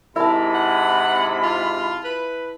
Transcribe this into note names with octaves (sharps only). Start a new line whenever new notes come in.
G#2 C3 E4 A#4 A5 B5
F#5
F4
B4